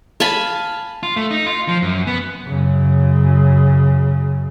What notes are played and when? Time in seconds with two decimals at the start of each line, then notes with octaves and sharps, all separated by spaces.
0.20 F5 G#5 A5 B5
1.03 F4
1.16 A3
1.31 D#4
1.46 F4
1.68 F3
1.82 F#2
2.07 B3
2.47 F#2 C#3